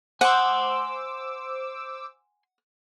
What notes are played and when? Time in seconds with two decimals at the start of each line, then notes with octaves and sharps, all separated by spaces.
0.21 C5 F#5 G#5 C6 D6 E6